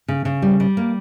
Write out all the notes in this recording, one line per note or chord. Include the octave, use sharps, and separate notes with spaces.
C#3
C#3
G3
G3
A#3